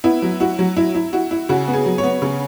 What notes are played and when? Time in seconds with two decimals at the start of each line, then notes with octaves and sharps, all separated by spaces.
0.04 B3 E4
0.22 F#3
0.40 E4 F#4
0.59 F#3
0.77 E4
0.95 E4
1.13 E4 F#4
1.31 E4
1.49 C#3 F#4
1.68 B3
1.73 G#4
1.86 F#3
1.98 C#5
2.04 B3
2.22 C#3